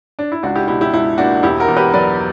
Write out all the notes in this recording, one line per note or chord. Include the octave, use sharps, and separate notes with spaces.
D4
E4
C#2 D4 F#4
E4 G4
B2 E4 G4
E4 G4
C#2 E4
A#3 D4 F#4
E1 E4 G4
F#4 A#4
E2
G4 B4
F#3 B4 D5